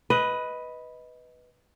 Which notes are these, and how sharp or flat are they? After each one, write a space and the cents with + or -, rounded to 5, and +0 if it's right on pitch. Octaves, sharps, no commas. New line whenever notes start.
B4 +0 D#5 +15